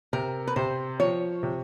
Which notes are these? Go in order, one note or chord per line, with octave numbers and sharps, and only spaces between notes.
C3 A#4
B4
C3 C5
F3 C#5
C3